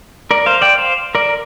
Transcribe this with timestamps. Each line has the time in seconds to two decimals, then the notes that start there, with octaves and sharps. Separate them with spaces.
0.31 A#4 D5
0.46 C5 F5
0.62 D5 G5
0.78 C5 F5
1.15 A#4 D5